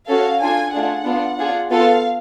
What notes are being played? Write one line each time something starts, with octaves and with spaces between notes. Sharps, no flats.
C#4 F#4 A4 F5
D4 F4 A4 G#5
A3 D4 F4 G#4 F#5
B3 D4 F4
D4 F4 G#4
B3 F4 A4 F5